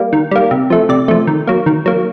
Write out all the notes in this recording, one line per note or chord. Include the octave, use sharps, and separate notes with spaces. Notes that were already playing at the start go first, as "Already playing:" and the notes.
Already playing: G3 A#3
D#3
G3 A#3
C3
F3 A3
C3 D5
F3 A3
D#3
F#3 A#3
D#3
F#3 A#3